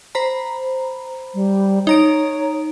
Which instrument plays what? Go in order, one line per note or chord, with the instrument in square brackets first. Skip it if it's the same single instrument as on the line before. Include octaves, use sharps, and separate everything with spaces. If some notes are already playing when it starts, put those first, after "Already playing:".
[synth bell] C5 A#5 B5
[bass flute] G3
[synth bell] D#4 A#5 D7 [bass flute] C#5